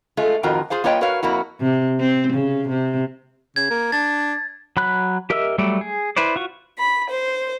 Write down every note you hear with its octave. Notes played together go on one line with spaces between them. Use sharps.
G#3 A3 F4
F2 A2 D#3 F4 F#4 A#4
F4 G#4 C5 F5
A#3 F4 B4 C#5 D#5 G5
F#4 A#4 B4 C#5 F5
F2 A#3 E4 F#4
C3
C4
C#3
C3
C#3 G#6
A#3
D4 A6
F#3 B5 F#6
G4 A#4 D#5 E5 E6
F#3 G3 A3 D5
G#4
E4 B4 C5 D5
F4 F#4 C#6
B5
C5